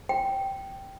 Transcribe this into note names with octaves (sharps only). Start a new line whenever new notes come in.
G5